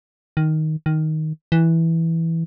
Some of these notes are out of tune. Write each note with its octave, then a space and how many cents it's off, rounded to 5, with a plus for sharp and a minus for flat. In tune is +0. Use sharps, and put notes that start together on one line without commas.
D#3 +5
D#3 +5
E3 -5